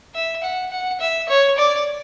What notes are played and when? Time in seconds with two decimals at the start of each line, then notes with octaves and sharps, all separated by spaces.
0.15 E5
0.43 F#5
0.71 F#5
1.00 E5
1.29 C#5
1.58 D5